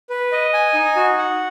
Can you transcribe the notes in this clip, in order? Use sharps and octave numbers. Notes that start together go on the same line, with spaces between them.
B4
D#5
G#5
D#4
F#4
F#5